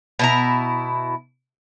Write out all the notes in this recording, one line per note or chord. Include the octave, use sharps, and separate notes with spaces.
B2 E4 A#5